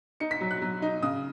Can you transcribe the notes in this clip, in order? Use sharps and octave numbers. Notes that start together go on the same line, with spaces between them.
D#4 C#7
B6
F#3
F#6
F#3
D#4
C#3 D#6